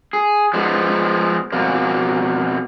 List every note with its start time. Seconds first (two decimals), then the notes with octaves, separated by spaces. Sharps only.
0.13 G#4
0.54 F3 G#3 B3
1.52 F2 B2 A#3